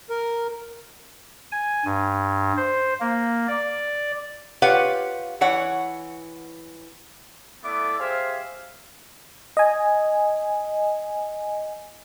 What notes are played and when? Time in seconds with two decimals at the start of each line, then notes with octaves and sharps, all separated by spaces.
0.10 A#4
1.52 G#5
1.85 G2
2.57 C5
3.00 A#3
3.48 D5
4.62 F4 G4 B4 C#5 F5 F#5
5.41 E3 C#5 F#5
7.63 A3 B3 E4 D5 E5 D6
7.99 G4 G#4 C5 E5 F5
9.57 D#5 G#5